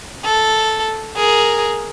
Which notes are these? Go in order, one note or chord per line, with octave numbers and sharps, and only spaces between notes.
A4
G#4 A#4